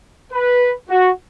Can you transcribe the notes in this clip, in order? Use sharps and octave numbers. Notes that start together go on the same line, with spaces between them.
B4
F#4